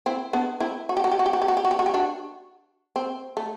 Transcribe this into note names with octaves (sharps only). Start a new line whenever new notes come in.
C4 E4
B3 D4
C4 E4
F#4
G4
F#4
G4
F#4
G4
F#4
G4
F#4
G4
F#4
G4
F#4
G4
D4 F#4
C4
A3